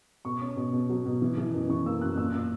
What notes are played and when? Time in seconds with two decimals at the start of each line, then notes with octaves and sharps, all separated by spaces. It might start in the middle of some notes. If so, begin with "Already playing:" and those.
0.25 B2 C#6
0.41 C#4
0.56 B2
0.73 B2
0.90 F#3
1.06 B2
1.22 E3
1.38 E3
1.54 F#2
1.69 E3 C#6
1.86 A#3 E6
2.02 F#2 F#6
2.18 A#2 E6
2.34 A#2